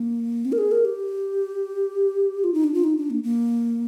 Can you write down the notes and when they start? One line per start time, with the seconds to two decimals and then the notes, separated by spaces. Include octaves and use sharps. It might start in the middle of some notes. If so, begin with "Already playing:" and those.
Already playing: A#3
0.45 C4
0.52 A#4
0.58 G#4
0.71 A#4
0.85 G4
2.44 F4
2.54 D#4
2.64 D4
2.74 F4
2.84 D#4
2.97 D4
3.10 A#3
3.23 A#3